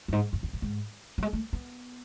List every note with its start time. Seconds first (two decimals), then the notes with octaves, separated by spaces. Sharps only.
0.08 F#2
0.12 G#2
0.33 F#2
0.43 E2
0.53 F#2
0.62 G#2
1.18 F#3
1.23 G#3
1.33 A3
1.53 B3